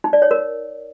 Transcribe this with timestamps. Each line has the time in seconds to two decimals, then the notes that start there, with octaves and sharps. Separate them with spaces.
0.04 D#4
0.13 D5
0.22 C#5
0.31 A#4